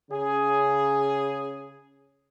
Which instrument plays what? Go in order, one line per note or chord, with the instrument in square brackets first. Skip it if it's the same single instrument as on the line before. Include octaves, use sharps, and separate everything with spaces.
[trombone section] C#3 G#4